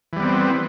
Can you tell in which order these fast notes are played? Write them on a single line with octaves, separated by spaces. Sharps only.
E3 G3 B3 C4